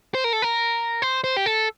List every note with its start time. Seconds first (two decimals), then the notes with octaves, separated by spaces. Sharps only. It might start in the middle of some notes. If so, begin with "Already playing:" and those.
0.15 C5
0.24 A#4
0.33 A4
0.42 A#4
1.02 C5
1.24 C5
1.37 G4
1.46 A4